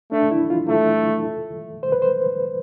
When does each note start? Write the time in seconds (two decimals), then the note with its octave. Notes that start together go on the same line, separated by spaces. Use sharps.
0.12 A3 D4
0.31 E4
0.50 F4
0.69 A3 A4
1.83 C5
1.92 B4
2.02 C5